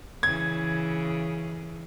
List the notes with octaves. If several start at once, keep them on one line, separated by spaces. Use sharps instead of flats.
C#3 E3 G#6